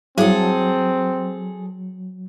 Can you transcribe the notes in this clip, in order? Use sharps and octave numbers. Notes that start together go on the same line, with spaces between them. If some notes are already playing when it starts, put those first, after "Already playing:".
F#3 G3 C4 E4 G#4 A4